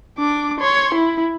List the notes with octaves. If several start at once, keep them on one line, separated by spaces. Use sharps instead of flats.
D4 D6
C#5 C6
E4